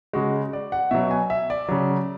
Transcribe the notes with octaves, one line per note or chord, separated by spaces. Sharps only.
C#3 G#3 F#4
D5
F#5
B2 F#3 E5
G#5
E5
D5
C#3 F#3